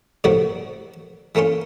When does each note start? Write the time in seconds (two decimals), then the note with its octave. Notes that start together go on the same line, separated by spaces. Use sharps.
0.24 A2 C3 F3 A3 A#3 F#4
1.35 E3 A3 A#3 C#4 F4